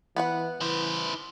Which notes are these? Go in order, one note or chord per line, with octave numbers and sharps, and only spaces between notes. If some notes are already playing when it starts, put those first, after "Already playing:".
E3 B3 B4 F#5
E3 E4 C5